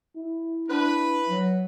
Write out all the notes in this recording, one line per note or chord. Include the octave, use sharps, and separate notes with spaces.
E4
D4 B4
F#3